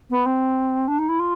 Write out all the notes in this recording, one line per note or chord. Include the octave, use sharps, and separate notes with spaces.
B3
C4
D4
D#4
E4
F4